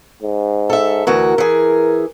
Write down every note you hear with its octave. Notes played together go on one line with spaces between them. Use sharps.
G#2
A4 E5
D2 E3 F#4 A#4
E3 G#4